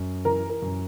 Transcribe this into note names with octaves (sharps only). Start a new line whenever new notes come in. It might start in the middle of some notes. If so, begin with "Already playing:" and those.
Already playing: F#2
E3 A#4
A#4
F#2